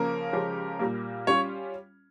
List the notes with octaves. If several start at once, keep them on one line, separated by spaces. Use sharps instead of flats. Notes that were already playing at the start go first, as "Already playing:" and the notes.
Already playing: C#3 F3 A#3 C#4 A#4
C#3 F3 G#3 C#4 G4
A#2 G3 A#3
G3 C#4 F4 C#5